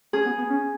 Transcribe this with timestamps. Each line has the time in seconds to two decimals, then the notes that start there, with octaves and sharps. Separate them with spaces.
0.13 C#4 G#4
0.26 B3
0.38 B3
0.50 C#4